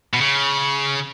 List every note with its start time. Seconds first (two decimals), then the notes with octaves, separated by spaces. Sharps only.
0.14 B2
0.21 C#3